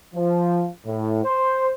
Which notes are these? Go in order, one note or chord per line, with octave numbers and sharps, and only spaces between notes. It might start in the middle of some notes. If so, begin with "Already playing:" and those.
F3
A2
C5